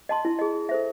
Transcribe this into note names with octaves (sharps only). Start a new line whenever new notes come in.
D#5 A5 C6
E4
G#4 D#5
E4
A4 C5 E5